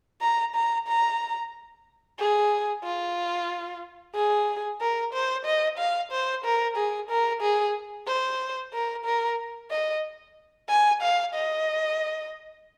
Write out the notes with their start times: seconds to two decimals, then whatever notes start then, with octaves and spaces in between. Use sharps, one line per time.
0.21 A#5
0.55 A#5
0.87 A#5
2.19 G#4
2.83 F4
4.15 G#4
4.81 A#4
5.13 C5
5.45 D#5
5.78 F5
6.11 C5
6.44 A#4
6.77 G#4
7.09 A#4
7.41 G#4
8.07 C5
8.73 A#4
9.05 A#4
9.71 D#5
10.69 G#5
11.02 F5
11.34 D#5